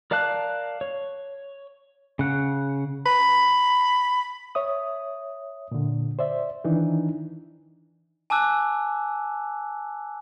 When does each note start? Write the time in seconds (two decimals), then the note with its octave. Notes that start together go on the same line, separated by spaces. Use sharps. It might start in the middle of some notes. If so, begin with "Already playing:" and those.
0.11 A#4 D5 F5 A5 F#6
0.81 C#5
2.19 C#3 F#5
3.06 B5
4.55 C#5 E5 D#6
5.71 A#2 D3
6.19 C5 D5 E5
6.64 D#3 E3 D4 D#4
8.30 G#5 A5 D6 E6 F#6